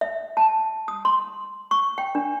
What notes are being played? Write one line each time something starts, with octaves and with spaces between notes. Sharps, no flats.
E5
A5
D#6
C6
C#6
G5
D4